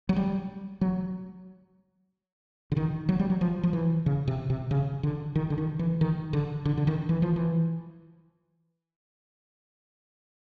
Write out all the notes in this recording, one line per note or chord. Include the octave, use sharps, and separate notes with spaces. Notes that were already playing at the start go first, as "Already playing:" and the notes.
F#3
G3
F#3
D3
D#3
F#3
G3
F#3
F3
F3
E3
C#3
C3
C3
C#3
D3
D#3
D3
D#3
E3
D#3
D3
D3
D3
D#3
E3
F3
E3